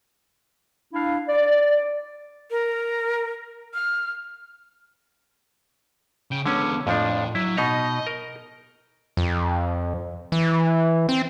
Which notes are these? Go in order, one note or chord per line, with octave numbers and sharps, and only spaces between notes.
D4 E4 F5
D5
A#4
F6
C#3 G5
D3 G#3 B3 C#4
F2 A2 F3 D4
F#3 E4
B2 D#4 D#5 A#5
A#4
F2
E3
C4